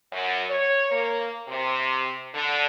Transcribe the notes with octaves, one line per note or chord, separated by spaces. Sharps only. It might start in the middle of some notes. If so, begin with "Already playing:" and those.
F#2
C#5
A#3
C3
D3